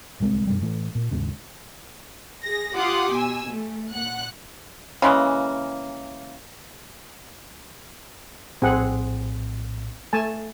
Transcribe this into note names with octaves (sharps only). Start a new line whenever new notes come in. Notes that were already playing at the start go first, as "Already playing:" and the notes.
D1 C2 G#3 C4
F#2 B2 G3
A2 E3 A3
A#2
D#2 G#2 C#3
G#4 A#6
F4 G4 F#5 C6 D6 D#6
B2 G#5 E6
A3
A#2 F#5 F#6
C#3 E3 G#3 A#3
A#1 A2 C4 G#4 F#5
A3 G#5 A5